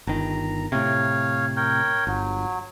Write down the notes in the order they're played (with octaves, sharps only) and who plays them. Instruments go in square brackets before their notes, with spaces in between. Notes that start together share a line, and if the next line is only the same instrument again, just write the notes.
[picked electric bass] G1 D#3 [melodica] A#5
[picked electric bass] A2 C3 [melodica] C#5 F5
[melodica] A#4 C#5 G5
[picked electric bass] G1 [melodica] F#3